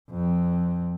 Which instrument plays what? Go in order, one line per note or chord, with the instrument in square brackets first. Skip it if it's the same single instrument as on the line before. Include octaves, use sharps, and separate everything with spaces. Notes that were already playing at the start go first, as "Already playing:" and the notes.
[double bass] F2